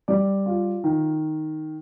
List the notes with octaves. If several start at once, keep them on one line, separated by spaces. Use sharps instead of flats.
G3 D5
F4
D#3